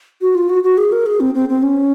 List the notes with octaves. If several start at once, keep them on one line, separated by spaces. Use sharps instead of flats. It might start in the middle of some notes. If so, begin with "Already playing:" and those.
F#4
F4
F#4
F#4
G#4
A#4
G#4
C4
C4
C4
C#4